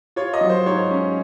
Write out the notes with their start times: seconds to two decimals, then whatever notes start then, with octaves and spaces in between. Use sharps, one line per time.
0.16 F4 C#5
0.34 D#5
0.41 F#3
0.50 C5
0.66 G#2 C#5
0.91 C#4